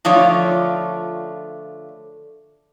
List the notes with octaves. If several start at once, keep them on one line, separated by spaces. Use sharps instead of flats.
D3 F3 A3 F4 C#5 D5